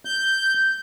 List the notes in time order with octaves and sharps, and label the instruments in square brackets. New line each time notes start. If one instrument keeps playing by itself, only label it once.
[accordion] G6